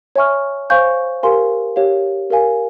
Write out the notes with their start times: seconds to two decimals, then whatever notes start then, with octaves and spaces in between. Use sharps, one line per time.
0.16 C#5 E5 G#5 C#6 F6
0.70 C5 F5 G#5 C#6 G6
1.23 G4 A#4 F5 G#5 C6
1.76 G4 C#5 F5
2.30 G4 A#4 F5 G#5